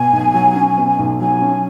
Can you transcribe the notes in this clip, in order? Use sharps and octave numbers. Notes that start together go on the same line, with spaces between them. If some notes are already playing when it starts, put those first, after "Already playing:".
Already playing: B2 G#5
B1
F#3
C#4
B2
B1
F#3 G#5
C#4